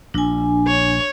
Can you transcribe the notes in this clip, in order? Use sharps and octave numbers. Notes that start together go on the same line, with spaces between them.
A#1 D4 G#5
C#5